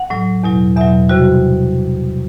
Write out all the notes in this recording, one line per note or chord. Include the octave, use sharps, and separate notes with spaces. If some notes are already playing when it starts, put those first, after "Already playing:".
Already playing: F#5
A2 F#3
E2 B2 F#3
E2 B2 F#3 E5
C3 G3 F#4